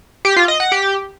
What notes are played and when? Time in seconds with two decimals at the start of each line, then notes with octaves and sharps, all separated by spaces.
0.25 G4
0.36 F4
0.48 D#5
0.60 F#5
0.72 G4